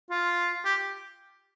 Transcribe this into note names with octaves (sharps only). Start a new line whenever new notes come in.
F4
G4